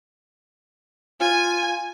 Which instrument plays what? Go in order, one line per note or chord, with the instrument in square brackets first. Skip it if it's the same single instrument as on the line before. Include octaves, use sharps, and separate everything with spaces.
[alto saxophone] F4 [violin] G#5